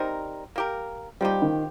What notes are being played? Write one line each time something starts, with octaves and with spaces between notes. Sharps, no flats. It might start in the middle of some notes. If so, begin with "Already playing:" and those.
Already playing: G3 C4 D#4 A#4
A#3 G4 A#4
F3 G3 C4 D#4 G4
D#3